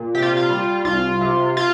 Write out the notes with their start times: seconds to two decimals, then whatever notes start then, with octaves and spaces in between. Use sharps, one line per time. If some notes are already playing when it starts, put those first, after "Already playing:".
Already playing: A#2
0.15 C3 G4
0.22 F4
0.37 F4
0.50 G3
0.85 C2 F4
1.21 C3
1.57 F4